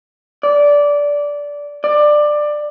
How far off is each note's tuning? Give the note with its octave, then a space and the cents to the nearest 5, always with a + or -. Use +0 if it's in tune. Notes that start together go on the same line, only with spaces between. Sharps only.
D5 -15
D5 +15